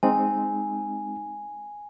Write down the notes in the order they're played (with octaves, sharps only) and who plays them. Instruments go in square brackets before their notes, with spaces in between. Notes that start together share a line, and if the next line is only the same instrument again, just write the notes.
[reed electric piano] G#3 C4 D#4 [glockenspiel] G#5